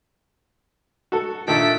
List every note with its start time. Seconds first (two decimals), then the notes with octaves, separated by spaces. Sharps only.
1.12 F#4 A4
1.48 A#2 D#3 A3 D4 A4 B6 D7